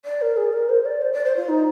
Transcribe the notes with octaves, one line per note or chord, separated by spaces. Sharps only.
D5
A#4
G#4
A#4
C5
D5
C5
D5
C5
F4
D#4